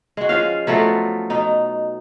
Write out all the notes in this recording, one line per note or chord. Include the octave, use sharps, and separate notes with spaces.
G#3 F#4
F3 C#4 F5
F3 F#3 A3 B3
B2 D#4